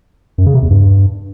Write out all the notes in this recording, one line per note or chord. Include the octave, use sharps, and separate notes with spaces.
F#2
C#3
C3
E2
G2